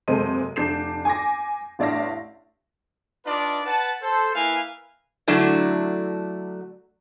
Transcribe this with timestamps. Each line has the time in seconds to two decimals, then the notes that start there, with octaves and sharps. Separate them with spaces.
0.08 F#1 C3 G#3 A4 C5 D#7
0.56 F1 D4 G6 C7 E7
1.05 G#5 D6 A#6
1.79 A1 D4 D5 E5 F5 A#6
3.26 D4 D#4 F4 B4 D5
3.65 B4 F#5 A5
4.02 A4 C5
4.35 A#3 E4 B4 F5 G#5
5.28 D3 F#3 A3 D4 E4